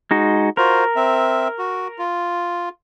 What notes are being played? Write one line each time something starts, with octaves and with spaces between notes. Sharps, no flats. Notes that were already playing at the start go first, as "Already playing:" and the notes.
G#3 D#4 F#4
F4 F#4 A#4 C5
C4 E5
F#4
F4